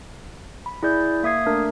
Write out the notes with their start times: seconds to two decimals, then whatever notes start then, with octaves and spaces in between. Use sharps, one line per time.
0.66 B5
0.83 E4 G#4 D5 G6
1.23 A#3 E5 D#6 G#6 C7
1.46 A3 D4 A#4